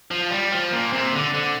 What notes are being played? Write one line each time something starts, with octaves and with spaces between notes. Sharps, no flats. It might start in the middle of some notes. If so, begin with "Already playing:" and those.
F3
G3
F3
A#2
C3
D3
D3